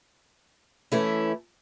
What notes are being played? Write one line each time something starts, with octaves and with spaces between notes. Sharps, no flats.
E3 A3 C#4 E4